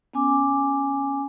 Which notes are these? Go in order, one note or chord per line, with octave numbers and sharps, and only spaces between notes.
B3 C#4 G#5 D6